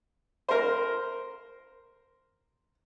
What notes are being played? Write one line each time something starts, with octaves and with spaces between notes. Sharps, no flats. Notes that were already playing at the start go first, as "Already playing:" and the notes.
A#4 C5